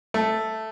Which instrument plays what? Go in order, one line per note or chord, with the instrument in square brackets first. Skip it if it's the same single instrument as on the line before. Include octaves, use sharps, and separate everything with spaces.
[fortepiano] A3